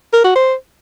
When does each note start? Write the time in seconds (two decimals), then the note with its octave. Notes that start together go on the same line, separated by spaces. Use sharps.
0.13 A#4
0.24 F#4
0.36 C5